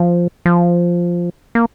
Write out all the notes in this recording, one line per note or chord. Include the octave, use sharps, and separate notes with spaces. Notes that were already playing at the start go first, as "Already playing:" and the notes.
Already playing: F3
F3
A#3